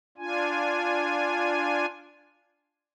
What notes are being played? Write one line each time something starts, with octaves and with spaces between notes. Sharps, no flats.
D4 F4 G#5